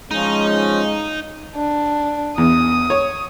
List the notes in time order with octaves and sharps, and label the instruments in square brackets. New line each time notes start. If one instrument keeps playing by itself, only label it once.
[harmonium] F3 C#4 [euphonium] G#3 [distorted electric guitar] D#4
[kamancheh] D4
[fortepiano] E2 [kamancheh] D#6
[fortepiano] C#5